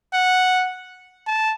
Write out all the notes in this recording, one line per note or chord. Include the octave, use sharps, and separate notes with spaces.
F#5
A5